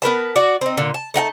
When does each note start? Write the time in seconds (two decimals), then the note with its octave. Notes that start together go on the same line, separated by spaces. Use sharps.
0.02 B3 A#4 B4 A5
0.36 F#4 D5
0.61 C4 D#4
0.77 A#2 D3
0.94 A5
1.14 A3 D#4 F#5 A5